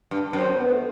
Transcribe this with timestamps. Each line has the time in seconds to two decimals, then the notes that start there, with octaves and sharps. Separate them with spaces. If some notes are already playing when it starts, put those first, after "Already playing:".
0.11 G2
0.33 F#2 C4
0.56 B3
0.70 A3